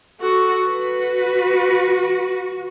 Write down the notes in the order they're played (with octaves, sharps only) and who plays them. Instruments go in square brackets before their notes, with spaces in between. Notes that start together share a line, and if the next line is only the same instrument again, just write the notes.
[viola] F#4 A4
[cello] F#4 [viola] B4